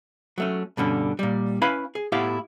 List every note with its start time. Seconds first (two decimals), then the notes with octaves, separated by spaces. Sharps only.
0.38 F#3 A3 C#4
0.77 G2 B2 D3 C#4
1.19 A#2 G3
1.62 C#4 E4 B4 F5 G#5 B5
1.95 G#4
2.12 A2 B3 E4 G4 F5